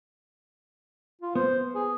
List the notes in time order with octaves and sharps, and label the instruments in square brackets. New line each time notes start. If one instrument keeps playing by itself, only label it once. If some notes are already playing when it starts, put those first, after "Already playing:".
[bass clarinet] F4
[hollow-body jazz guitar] B3 [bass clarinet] C5
[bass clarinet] G#4